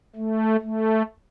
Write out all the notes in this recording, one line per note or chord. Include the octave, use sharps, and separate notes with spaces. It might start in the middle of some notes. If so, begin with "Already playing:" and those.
A3
A3